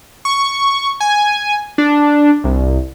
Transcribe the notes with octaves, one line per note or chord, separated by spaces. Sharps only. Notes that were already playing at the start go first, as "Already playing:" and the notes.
C#6
G#5
D4
C2